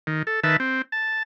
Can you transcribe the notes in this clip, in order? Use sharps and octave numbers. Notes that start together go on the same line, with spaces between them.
D#3
A4
D#3 B4 E5 A5
C4
A5